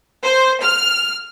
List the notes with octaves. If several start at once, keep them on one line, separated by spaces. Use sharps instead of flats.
C5
F6